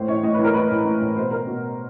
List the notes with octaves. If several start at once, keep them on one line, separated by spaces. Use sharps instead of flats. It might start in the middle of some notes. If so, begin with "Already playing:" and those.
Already playing: A2 C5
E3 C#5
A2 D#5
E3 B4
A#4
A2 B4
E3
A2
E3
B2 C5
A#4
B2